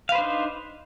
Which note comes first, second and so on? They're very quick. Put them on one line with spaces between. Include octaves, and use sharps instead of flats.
F5 B4 C5 D4 D#4